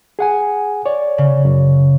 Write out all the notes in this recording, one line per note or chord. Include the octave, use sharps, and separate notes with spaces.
G#4 F#5 G#5
C#5 D5
C#3
F#2